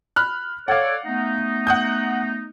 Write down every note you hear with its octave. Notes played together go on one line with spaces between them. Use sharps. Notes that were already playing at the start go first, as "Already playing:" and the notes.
B5 F6 F#6
A4 C#5 D5 F5 F#5
A3 B3 D#4
F#5 D#6 G6